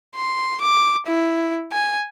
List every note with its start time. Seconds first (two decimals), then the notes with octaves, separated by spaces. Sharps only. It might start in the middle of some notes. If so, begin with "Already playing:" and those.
0.15 C6
0.61 D6
1.06 E4
1.72 G#5